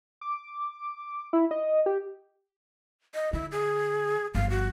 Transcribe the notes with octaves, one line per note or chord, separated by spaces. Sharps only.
D6
E4
D#5
G4
D#5
D3 E4
G#4
G1 F3 F5
F#4